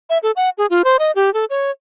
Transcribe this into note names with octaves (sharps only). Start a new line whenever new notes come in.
E5
A4
F#5
G#4
F4
C5
D#5
G4
A4
C#5